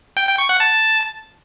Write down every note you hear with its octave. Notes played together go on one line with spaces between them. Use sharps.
G5
G5
C#6
F#5
A5